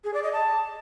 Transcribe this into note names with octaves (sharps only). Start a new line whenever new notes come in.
G#4
D5
D#5
A5